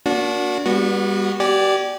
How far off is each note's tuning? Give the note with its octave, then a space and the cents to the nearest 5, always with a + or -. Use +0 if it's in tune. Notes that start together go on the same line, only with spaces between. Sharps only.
A#3 +15 D4 -25 F#4 -25
G3 +25 B3 -30 F#4 +0
G4 -30 D5 +0 G#5 +0